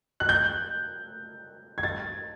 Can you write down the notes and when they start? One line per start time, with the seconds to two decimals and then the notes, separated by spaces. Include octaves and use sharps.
0.20 F#6
0.29 G6
1.78 G#6
1.83 A6